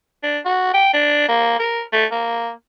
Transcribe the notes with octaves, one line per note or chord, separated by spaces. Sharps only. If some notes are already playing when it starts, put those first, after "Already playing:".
D4
F#4
G5
D4
A#3
A#4
A3
A#3